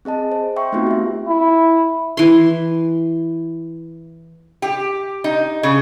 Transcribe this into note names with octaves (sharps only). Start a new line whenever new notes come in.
C4 G#4 D#5 A5
C5
E5 G5 C6 C#6
A3 B3 C4 D#4 F4 F#4
G4 E5
E4
E3 C6
G4
D#4
C#3